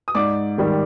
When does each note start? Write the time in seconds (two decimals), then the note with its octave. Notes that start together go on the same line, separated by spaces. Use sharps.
0.08 D#6
0.15 G#2 D5 D6
0.58 D#3 G3